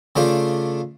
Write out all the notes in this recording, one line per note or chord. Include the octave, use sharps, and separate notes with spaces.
C#3 A3 D4 F4 C5